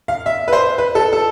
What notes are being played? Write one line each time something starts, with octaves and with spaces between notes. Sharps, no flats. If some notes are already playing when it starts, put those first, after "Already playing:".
F5
E5
B4
C5
B4
A4
A4